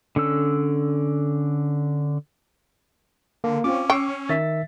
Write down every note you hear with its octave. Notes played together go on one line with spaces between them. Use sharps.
D3 C#4 A4 E6
D3 A#3
C4 C#4 F4 D6
G5 C#6 E6 C7
D#3 E5 A6 B6